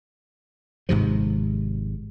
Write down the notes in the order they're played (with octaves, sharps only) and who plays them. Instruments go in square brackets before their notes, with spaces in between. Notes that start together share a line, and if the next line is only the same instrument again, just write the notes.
[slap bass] G#1 G#2 C3 F3